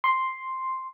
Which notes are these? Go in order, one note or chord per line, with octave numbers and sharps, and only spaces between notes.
C6